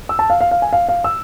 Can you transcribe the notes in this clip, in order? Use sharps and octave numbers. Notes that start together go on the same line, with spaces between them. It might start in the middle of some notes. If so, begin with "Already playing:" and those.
E6
A5
F5
F5
F5
G#5
F5
F5
E6